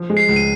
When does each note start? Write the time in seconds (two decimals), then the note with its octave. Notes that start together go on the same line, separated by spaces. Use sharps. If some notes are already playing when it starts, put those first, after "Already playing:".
Already playing: F3
0.10 G#3
0.17 C7
0.29 C#2
0.36 D#7